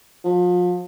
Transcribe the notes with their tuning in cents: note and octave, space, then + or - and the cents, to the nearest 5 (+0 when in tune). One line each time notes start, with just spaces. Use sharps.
F3 +35